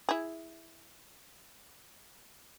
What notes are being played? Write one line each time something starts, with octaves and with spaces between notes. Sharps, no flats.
E4 G#4